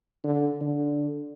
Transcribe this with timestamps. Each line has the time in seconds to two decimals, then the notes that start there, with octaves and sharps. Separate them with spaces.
0.24 D3
0.61 D3